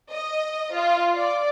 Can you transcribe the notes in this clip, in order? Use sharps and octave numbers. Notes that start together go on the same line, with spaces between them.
D#5
F4
D5